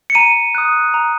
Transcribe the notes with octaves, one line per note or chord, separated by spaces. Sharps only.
C#7
A#5 D#7
D#6 F#6
A#5